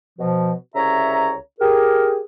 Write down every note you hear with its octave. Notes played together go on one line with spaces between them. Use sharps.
B2 F3
C2 C#3 C#5 E5 A#5
G4 G#4 A#4